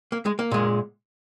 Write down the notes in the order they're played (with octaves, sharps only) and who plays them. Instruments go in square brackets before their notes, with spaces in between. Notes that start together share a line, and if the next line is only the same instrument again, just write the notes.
[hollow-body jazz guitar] A#3
G#3
A#3
A#2 G#3